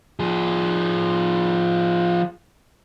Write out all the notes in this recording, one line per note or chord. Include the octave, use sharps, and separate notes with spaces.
F3 G#4